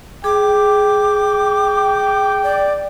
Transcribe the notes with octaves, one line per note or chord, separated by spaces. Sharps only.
G#4 G5 D6
D5